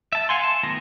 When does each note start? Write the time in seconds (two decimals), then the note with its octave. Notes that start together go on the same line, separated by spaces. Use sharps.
0.13 E5 A5
0.29 F5 F#5 G#5 C6
0.43 A5
0.63 D#3 A3 B3 F4 A#5